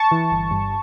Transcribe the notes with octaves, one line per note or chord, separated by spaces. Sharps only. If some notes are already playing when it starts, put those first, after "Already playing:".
Already playing: A5 C#6
E3
G1
G2